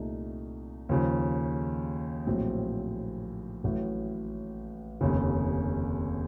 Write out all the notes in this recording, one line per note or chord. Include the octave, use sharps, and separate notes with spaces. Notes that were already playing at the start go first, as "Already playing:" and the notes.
Already playing: C2 A#2 A3 D#4
D#2 C#3 F3
A#1 A2 F#3 C4
A1 A2 F#3
F1 D#2 C#3